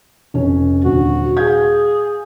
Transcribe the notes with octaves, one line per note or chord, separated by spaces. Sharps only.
F1 C#4 C#5
D#1 D3 F#4
G#4 F5 G6 G#6